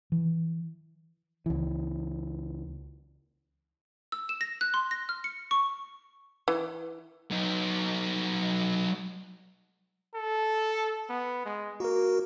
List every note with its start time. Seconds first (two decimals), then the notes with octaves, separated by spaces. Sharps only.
0.12 E3
1.46 C#2 E3
4.12 E6
4.29 E7
4.41 A#6
4.61 F#6
4.74 C6
4.91 A#6
5.09 F6
5.24 C#7
5.51 C#6
6.48 E3
7.31 F#3 D#4
10.15 A4
11.09 B3
11.45 G#3
11.80 A#3 F#4 A#4